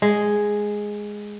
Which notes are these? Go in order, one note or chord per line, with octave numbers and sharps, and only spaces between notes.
G#3